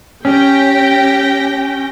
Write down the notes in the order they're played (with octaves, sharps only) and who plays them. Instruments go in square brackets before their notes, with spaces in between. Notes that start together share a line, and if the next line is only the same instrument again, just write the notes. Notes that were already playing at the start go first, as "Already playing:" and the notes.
[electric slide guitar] C#4 [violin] G4 A#6 [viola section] G5